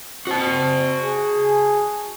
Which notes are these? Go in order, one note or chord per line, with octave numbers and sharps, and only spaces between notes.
C4 F#4 A5
G#4